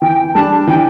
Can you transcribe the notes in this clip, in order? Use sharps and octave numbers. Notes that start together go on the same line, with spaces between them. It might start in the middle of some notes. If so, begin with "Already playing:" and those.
E3 G5
G3 D4 A5
E3 G5